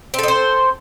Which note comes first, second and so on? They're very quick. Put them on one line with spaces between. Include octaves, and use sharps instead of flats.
C4 A4 D#5 C5